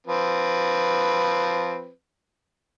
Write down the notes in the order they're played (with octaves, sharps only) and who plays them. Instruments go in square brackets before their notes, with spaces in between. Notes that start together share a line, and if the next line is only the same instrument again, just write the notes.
[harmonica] F3 C4 B4